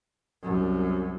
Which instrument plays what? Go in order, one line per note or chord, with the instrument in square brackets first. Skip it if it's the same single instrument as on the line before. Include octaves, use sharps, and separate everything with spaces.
[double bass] C2 F#2